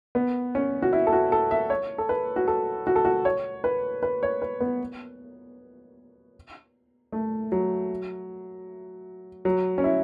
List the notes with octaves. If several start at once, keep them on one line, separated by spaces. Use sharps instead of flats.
B3
C#4
F#4
E4
A4
F#4
A4
E5
C#5
A4
B4
F#4
A4
F#4
A4
F#4
C#5
B4
B4
C#5
B4
B3
A3
F#3
F#3
C#4
E4